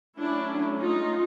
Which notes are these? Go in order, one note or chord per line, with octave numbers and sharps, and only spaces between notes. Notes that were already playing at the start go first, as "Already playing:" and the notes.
F#3 A3 C#4 D4 E4
D#4 F4